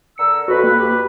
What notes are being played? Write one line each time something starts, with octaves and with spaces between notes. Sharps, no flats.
D3 A#4 E6 C#7
F2 F#4 B4
A#3
G4